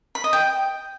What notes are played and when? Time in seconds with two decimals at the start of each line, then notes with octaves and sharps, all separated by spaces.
0.15 B5
0.24 D#5
0.33 G5